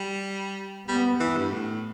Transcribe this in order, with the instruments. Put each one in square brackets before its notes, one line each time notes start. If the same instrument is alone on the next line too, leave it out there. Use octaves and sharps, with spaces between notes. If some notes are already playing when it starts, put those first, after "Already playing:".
Already playing: [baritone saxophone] G3
[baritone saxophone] G3 [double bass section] B3
[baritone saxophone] E3
G2
A2